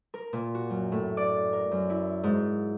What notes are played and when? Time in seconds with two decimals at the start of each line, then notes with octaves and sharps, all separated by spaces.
0.14 A#4
0.33 A#2
0.54 F#4
0.70 F#2
0.92 A2
1.17 D5
1.53 A#4
1.71 F#2
1.90 E4
2.24 G#2